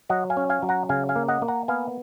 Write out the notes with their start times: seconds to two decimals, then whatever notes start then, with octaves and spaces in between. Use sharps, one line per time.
0.09 F#3 D#5 F#5
0.30 F5 G#5
0.37 C#4
0.50 F5 G#5
0.62 F#3
0.69 F#5 A#5
0.89 C#3 F5 G#5
1.09 F5 G#5
1.16 A#3
1.28 D#5 F#5
1.42 A#3
1.48 F#5 A#5
1.68 B3 F5 G#5